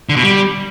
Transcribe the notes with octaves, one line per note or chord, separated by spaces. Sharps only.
D3
B2
G3